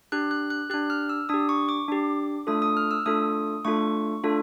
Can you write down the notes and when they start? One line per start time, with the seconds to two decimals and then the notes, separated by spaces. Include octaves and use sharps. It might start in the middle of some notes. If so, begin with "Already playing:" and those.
0.12 D4 G4 F#6
0.31 F#6
0.50 F#6
0.70 D4 G4 F#6
0.90 F6
1.09 E6
1.29 D4 G4 D#6
1.49 C#6
1.69 D6
1.88 D4 G4
2.47 A3 D4 F4 A4 D#6
2.62 D#6
2.77 F6
2.91 E6
3.06 A3 D4 F4 A4 D#6
3.65 A3 D4 F4 A4 C#6
4.23 A3 D4 F4 A4